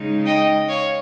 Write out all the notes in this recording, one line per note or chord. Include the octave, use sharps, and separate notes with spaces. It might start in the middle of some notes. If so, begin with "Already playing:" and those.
Already playing: C#3 G#3 D#4
D#5 G5
C#5 F5